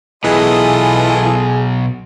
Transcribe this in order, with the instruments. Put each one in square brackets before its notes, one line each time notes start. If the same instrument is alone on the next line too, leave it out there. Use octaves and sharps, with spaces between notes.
[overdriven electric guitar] B1 B2 [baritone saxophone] E3 [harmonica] F4 A4 D#5 [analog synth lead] G#4